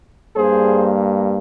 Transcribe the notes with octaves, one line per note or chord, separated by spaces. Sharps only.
G2 G3 A#3 G#4 C5